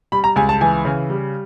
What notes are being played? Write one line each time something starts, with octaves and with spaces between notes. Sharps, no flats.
G3 B5
A#5
C#2 G#5
A5
E3 G#5
C#3
G3